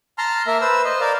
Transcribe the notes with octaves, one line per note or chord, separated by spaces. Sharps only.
A5 A#5 C6 F6
A#3 A#4 E5
B4 C5 E6
C5 D#5
A#4 D5 F5